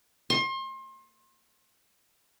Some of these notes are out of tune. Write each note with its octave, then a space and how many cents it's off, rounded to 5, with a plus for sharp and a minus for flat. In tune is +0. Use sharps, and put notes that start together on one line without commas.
C6 +35